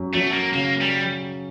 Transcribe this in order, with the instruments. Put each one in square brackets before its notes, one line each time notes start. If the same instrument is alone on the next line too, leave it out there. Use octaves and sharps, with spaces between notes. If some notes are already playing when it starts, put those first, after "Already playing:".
Already playing: [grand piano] F#2
[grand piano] F#3 [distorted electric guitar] A3
[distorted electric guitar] A#3
[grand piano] C#3 [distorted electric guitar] A#3
[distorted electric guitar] G3